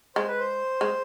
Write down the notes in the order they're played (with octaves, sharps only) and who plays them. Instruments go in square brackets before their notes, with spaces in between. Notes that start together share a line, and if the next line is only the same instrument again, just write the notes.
[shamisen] G#3 [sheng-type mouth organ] C5
[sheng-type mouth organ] B4
C5
[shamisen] G#3